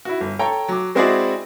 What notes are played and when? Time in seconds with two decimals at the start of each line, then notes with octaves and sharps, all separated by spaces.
0.05 E4 F#4
0.21 G1
0.39 A4 C#5 G5 A#5
0.68 F#3 D6
0.95 G#3 C4 E4 F#4 G#4 D5